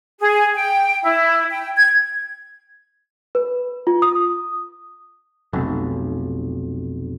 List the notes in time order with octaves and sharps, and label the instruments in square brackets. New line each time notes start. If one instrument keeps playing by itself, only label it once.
[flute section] G#4
G5
E4
G5
G#6
[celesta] B4
F4
D#6
[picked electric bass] F1 B1